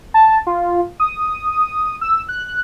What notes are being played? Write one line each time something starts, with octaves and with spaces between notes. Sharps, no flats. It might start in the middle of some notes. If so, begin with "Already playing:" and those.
A5
F4
D#6
E6
F#6